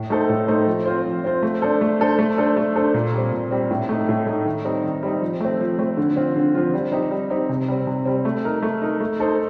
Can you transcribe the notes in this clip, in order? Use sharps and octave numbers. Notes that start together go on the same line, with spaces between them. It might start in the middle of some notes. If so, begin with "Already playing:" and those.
Already playing: A2
A3 D#4 A4 C5
A2
A3 D#4 A4 C5
F3
C4 F4 C5
F3
C4 F4 C5
A3
D4 A4 C5
A3
D4 A4 C5
A3
D4 A4 C5
A3
D4 A4 C5
A#2
G3 C4
A#2
G3 C4
A2
A3 D#4
A2
A3 D#4
D#3
G3 C4 D#4
D#3
G3 C4 D#4
F3
A3 C4
F3
A3 C4
D3
F3 C4 F4
D3
F3 C4 F4
G3
C4 D#4 G4
G3
C4 D#4 G4
C3
G3 C4
C3
G3 C4
A3
D#4 A#4
A3
D#4 A#4
A3
D#4 A4 C5